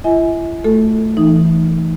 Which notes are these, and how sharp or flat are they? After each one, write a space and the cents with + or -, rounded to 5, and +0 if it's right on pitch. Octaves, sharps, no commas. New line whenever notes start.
E4 +40 E5 -45 G#5 +10
A3 +0 F#4 -30 A4 +0
E3 +0 D#4 +0 D#6 +0